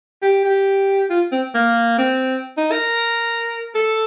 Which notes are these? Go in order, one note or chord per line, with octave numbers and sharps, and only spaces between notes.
G4
G4
F4
C4
A#3
C4
D#4
A#4
A4